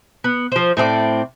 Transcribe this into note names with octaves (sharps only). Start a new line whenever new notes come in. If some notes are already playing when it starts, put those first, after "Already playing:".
B3
F3 C5
A2 C4 G#4 D5